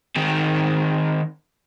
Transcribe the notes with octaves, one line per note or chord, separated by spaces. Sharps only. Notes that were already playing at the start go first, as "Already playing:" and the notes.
D#3 C4